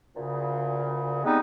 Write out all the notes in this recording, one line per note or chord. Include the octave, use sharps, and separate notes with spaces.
D2 A#2 C#3
G3 G#3 B3 C4 D#4